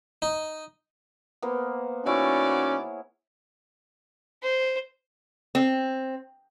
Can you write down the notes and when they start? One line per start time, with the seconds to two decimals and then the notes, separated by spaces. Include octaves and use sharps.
0.22 D#4
1.42 A#3 B3 C5
2.06 D#3 C#4 E4 F#4 G#4 C#5 D5
4.43 C5
5.55 C4